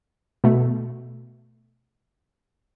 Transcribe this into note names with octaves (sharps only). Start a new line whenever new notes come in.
B2 A3